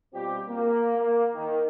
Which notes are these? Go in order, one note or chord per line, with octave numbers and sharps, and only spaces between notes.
B2 G3 C4 F4 G4
A#3
A#3
D#3